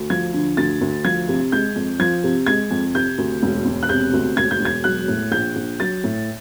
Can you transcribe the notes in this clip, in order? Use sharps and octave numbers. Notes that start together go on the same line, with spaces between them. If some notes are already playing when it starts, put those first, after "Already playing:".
Already playing: D2
F3 G#6
D3
D2 A6
D2
F3 G#6
C3
G#3 G6
F2
F3 G#6
C3
G#3 G#6
F2
C3 G6
D2
E1
E1
F#6
C3 G6
D2
E1 G#6
G6
E1
G#6
F#3 F#6
A2
A#1 G6
A#1
F#3 A6
A2